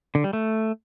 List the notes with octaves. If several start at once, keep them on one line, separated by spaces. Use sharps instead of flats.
D3
G3
A3